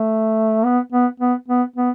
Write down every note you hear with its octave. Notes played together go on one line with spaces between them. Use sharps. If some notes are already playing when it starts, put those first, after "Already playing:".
Already playing: A3
B3
B3
B3
B3
B3